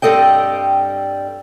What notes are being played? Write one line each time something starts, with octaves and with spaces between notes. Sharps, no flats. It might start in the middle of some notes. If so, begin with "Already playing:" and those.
G2 G3 C4 A4 D#5 G5